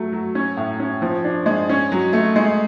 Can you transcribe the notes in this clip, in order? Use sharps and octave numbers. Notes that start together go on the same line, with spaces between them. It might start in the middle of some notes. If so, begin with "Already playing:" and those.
Already playing: F#3 A3
F#3
C#4
A2
C#4
F3
D4
G#3
C#4
F#3
A3
G#3